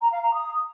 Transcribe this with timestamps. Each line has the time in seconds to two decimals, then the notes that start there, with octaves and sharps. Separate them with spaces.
0.01 A#5
0.12 F5
0.23 A#5
0.33 D#6